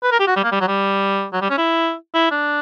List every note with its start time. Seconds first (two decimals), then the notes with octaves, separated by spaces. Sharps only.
0.03 B4
0.12 A#4
0.20 G4
0.27 F#4
0.36 G3
0.44 A#3
0.52 G3
0.61 F#3
0.68 G3
1.33 F#3
1.42 G3
1.50 C#4
1.58 E4
2.14 E4
2.31 D4